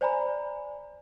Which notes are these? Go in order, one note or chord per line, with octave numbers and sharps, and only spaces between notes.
C5 D5 G#5 A#5 B5